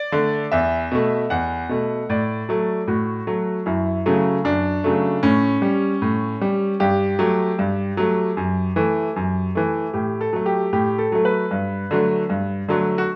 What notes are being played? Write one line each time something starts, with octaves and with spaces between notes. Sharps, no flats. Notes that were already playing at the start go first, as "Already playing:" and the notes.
Already playing: D5
D3 A3
E2 E5
B2 A3
E2 F#5
B2 A3
A2 D5
F#3 A3
A2 F#4
F#3 A3
F#2 E4
C#3 F#3 A3
F#2 D4
C#3 F#3 A3
A2 C#4
G3
A2
G3
G2 G4
F#3 A3
G2
F#3 A3
F#2
E3 A3
F#2
E3 A3
A2 G4
A4
F#3 A3
G4
A2 G4
A4
F#3 A3
B4
G2
D3 F#3 A3
G2
D3 F#3 A3
F#4